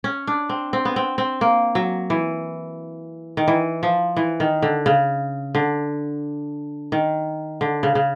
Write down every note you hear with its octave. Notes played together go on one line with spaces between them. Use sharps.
C#4
D4
C4
C4
B3
C4
C4
A#3
F#3
E3
D#3
E3
F3
E3
D#3
D3
C#3
D3
D#3
D3
C#3
C#3